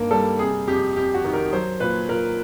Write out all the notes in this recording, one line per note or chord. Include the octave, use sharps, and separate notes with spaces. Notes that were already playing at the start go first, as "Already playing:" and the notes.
Already playing: G2 D#3 A#3 A#4
G3 A4
C3 G#4
F2 G4
F2 G4
F#4
D#3
A#4
F#3 C5
A#2 B4
A#2 A#4